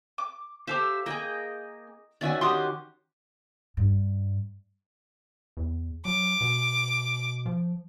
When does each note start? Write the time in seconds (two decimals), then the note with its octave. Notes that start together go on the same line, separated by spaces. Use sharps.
0.18 D6
0.67 G4 A4 C5 E5 F5
1.06 A#3 G#4 D#5 G5
2.21 D#3 C#4 F#4 D5 E5 G#5
2.41 F#4 G4 C6 D6 D#6
3.77 G2
5.57 E2
6.05 F#3 D6
6.41 B2
7.46 F3